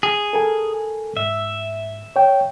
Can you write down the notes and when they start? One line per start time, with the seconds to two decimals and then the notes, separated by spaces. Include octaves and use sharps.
0.03 G#4
0.33 A4 A#4 G#5
1.17 G#2 E5
2.16 C#5 G5